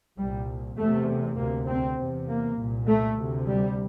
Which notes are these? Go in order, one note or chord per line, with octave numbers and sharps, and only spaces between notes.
C2 A#2 G3
E2 C3 A3
D2 C3 A#3
C4
E2 C3
A#3
C2 A#2
A3
D2 C3
G3